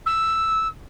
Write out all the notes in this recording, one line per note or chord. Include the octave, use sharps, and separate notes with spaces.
E6